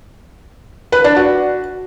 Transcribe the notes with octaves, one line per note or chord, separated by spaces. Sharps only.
B4
D4
F#4